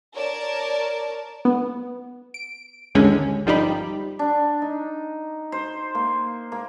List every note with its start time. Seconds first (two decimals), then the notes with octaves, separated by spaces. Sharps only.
0.15 A#4 C#5 D5 A5
1.45 B3
2.34 D7
2.95 A1 D#2 D3 G#3 C#4
3.46 G1 F3 G3 D#4 G4 B5
4.19 D4
4.62 D#4
5.52 C5
5.95 A#3
6.52 A#3